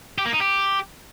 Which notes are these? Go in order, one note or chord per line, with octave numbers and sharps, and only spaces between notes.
G4
A#3
D#4
G4